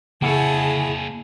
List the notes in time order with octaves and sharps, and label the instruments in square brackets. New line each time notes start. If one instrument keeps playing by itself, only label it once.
[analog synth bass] C#3 [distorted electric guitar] A#3 C#5 [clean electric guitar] E4 F#5 [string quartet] G#4 A5